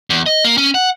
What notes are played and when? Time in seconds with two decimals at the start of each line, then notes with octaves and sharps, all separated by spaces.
0.10 E2
0.26 D#5
0.44 A#3
0.57 C#4
0.74 F#5